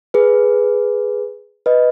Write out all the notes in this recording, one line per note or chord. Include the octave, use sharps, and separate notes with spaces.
G#4 B4
B4 D#5